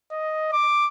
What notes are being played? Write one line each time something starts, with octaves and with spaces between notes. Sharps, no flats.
D#5
D6